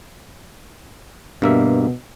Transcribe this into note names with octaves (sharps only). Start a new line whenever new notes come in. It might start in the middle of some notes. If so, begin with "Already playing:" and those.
G2 B2 A#3 E5